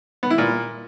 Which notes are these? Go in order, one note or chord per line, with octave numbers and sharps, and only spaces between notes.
B3
E4
A#2